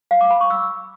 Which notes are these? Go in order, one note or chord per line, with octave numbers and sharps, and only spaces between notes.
F5
D6
B5
C#6
E6